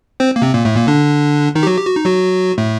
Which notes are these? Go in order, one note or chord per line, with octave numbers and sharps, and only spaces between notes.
C4 C5
A#3
C3 C4
A#2 A#3
A2 A3
A#2 A#3
D3 D4
D#3 D#4
G4
F#3 F#4
G4
F#4
D#4
F#3 F#4
A2 A3